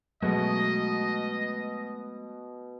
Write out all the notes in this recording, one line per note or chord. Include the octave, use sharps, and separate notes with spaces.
B2 F#3 G#3 A3 D#5